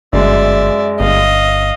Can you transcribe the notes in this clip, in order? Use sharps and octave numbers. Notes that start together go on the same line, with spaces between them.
G1 F#2 G#3 D5 E5
G1 D#5 F5